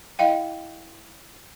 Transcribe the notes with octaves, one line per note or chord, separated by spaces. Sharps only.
E4 D#5 F5 G5